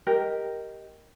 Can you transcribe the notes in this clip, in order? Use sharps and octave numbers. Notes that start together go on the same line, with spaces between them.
G4 A#4 D#5